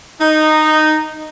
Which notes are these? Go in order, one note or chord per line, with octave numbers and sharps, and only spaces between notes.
D#4